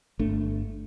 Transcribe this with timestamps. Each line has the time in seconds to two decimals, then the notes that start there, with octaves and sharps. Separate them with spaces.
0.19 G1 A3 D4